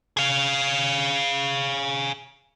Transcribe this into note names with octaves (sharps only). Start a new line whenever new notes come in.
G#4 F5